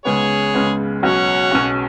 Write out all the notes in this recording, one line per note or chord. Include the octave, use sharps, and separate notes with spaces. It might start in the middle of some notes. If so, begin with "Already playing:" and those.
C#2 C#3 G#3 B3 G#4 C#5
C#2 C#3 G#3 B3
B1 B2 F#3 C#4 F#4 C#5 F#5
B1 B2 F#3 C#4 F#4